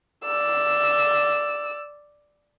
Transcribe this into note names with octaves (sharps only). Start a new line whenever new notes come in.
D5 E6